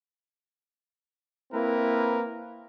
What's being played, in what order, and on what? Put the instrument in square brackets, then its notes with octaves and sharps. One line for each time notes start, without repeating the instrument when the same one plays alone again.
[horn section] A#3 C4 E4 A#4 B4